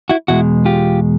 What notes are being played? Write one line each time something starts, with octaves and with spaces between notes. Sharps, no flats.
E4 F#4
E2 B2 G#3 E4 F#4
F4 G4